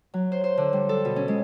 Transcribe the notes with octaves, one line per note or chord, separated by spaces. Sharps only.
F#3
C5
C5
D3
G3
A4
B2
C#4
G#3